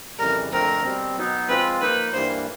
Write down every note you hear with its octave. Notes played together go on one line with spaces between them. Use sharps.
F2 C#3 E3 G3 A#4
F2 D3 F3 A3 C4 A#4
B2 G3 C4
B2 F#3 B3 D#4
F3 G#3 C4 F4 B4
F3 A#3 D#4 B4
G2 E3 G3 A#3 C5